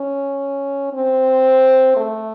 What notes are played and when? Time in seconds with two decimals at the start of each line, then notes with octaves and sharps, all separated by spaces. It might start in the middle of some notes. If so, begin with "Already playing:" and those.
Already playing: C#4
0.93 C4
1.96 A3